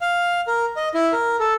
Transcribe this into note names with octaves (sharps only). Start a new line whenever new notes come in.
F5
A#4
D#5
E4
A#4
A4